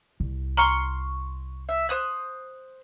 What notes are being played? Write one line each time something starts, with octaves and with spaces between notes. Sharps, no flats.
C2
A#5 C6 C#6 F6
E5
C5 D#6 F#6